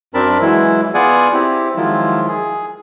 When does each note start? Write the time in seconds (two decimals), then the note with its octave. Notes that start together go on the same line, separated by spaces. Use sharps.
0.14 F#2 C4 D4 A#4 A5 B5
0.41 E3 F#3 G#3 E4
0.94 B3 F4 G#4 D5 F#5 G#5
1.33 C4 E4 G4
1.76 D#3 F3 F#3 G#3 E4 F4
2.28 G#4